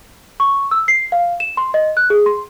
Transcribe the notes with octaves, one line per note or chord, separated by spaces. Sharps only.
C#6
E6
C7
F5
E7
C6
D#5
F#6
G#4
C6